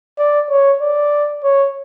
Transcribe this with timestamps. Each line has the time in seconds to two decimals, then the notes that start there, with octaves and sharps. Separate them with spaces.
0.18 D5
0.50 C#5
0.81 D5
1.44 C#5